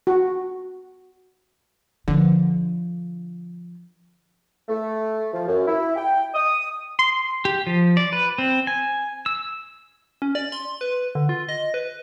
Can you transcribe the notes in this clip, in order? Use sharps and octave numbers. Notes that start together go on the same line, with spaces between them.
F#4
D3 F3
A3
F3
F#2
E4
G5
D#6
C6
G4
F3
D5
B4
C4
G#5
E6
C#4
D5
C6
B4
D3
F4
D#5
B4